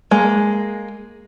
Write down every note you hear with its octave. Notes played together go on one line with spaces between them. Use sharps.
G#3 A#3